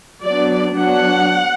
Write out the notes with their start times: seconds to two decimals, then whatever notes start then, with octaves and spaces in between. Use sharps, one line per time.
0.24 F#3 B3 D4 D5
0.77 F#3 B3 D4 F#5